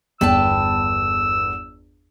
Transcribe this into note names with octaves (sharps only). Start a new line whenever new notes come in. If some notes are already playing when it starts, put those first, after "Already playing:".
G1 E2 B4 G5 A5 E6